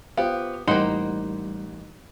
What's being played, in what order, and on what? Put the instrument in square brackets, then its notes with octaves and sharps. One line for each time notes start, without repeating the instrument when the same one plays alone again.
[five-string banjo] B3 G4 [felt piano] F4 C5 F5
[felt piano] A1 F#6 [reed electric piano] G3 [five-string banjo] A#3 D#4 [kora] C5 F#5